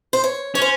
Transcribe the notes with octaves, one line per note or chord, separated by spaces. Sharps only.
C5
C#5
C#4 C#5
C5